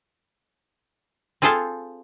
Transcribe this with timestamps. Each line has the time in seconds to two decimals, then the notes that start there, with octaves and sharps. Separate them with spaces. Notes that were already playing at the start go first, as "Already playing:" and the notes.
1.42 C4 F4 G#4 A4 C5 F5